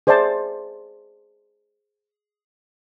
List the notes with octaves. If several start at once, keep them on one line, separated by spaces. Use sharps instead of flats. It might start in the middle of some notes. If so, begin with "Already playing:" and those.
G#4 C5 D5 E5 A5 C6